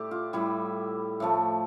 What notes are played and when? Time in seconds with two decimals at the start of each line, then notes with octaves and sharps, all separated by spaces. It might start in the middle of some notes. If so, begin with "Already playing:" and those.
Already playing: A2 G4 D5
0.11 F4
0.33 A2 G3 E4
1.20 A2 F3 A3